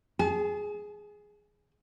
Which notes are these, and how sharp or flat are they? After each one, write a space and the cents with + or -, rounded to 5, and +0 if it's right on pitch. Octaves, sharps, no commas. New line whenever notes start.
G#4 +0 A5 -45